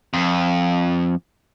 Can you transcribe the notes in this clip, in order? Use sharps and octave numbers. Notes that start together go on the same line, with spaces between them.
F2